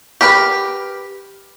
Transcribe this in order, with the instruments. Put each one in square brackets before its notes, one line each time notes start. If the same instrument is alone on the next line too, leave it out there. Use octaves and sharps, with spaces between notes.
[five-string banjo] G4 A#4 B4